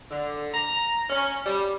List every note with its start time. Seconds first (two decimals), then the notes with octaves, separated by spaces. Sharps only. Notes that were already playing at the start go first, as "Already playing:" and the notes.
0.11 D3
0.53 A#5
1.09 C#4
1.45 G3